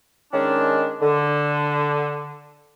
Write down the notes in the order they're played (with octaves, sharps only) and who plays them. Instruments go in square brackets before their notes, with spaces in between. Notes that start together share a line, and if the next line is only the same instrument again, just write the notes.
[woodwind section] D#3 G#3 C#4 D4
D3